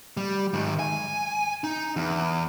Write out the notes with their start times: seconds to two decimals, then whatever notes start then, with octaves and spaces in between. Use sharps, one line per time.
0.17 G3
0.53 G#2 D#3
0.79 G#5
1.64 D#4
1.96 E2